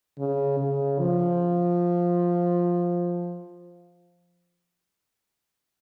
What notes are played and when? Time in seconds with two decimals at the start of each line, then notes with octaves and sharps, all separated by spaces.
0.18 C#3
0.59 C#3
0.99 F3